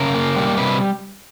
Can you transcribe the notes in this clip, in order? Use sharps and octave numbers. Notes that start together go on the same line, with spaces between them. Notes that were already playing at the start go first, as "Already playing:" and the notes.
Already playing: C#3 A#4
A#3
G3
C3 B4